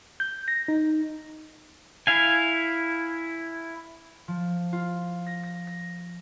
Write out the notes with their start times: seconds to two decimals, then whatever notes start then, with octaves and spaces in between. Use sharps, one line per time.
0.20 G6
0.48 A#6
0.68 D#4
2.07 E4 F5 G#5
4.28 F3
4.73 F4
5.26 A#6
5.43 A#6
5.67 A#6